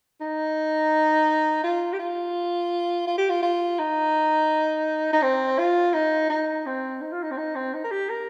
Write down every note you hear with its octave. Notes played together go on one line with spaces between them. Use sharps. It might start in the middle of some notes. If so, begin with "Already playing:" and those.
D#4
F4
G4
F4
F4
G4
F4
F4
D#4
D#4
C4
F4
D#4
D#4
C4
D#4
F4
D#4
C4
D#4
C4
D#4
A#4
G4
A#4